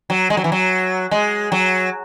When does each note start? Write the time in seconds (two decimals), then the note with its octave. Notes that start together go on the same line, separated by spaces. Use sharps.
0.10 F#3
0.30 G#3
0.37 F#3
0.44 E3
0.52 F#3
1.11 G#3
1.52 F#3